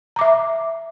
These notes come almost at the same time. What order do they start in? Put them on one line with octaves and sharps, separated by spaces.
A#5 D6 E5